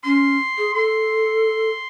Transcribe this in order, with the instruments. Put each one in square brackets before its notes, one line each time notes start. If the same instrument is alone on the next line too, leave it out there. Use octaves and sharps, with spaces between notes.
[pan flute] C#4 [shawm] C6
[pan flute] G#4
[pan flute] A4 [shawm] C6